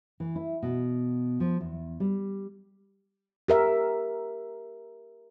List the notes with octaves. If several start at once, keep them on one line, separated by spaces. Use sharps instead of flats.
E3
E4
B2
F3
E2
G3
G4 A#4 E5